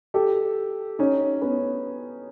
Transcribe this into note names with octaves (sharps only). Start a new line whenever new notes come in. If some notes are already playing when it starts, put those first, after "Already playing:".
G4 A4
C#4 D#4
B3 C#4